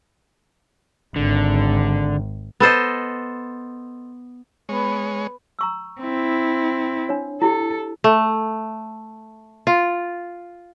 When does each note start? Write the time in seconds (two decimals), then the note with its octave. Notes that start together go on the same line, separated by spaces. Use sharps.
1.16 G#1 D3
2.60 B3 A4 C5 D#5
4.69 G#3 B3 B4 C#5
5.59 A#5 C#6 E6
6.01 C4 E4
7.09 D4 C#5
7.42 E4 G4 A4
8.04 A3
9.67 F4